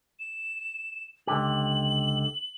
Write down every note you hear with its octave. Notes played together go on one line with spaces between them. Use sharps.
E7
C#2 D3 G4 F#7